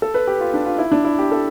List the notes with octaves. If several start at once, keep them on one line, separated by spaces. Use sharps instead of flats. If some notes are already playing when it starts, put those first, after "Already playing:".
A4
B4
G4
F4
D4
F4
E4
D4
E4
G4
A4